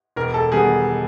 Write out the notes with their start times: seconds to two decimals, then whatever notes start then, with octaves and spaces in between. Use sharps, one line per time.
0.16 E1 A#4
0.34 A4
0.52 D#3 G3 B3 G#4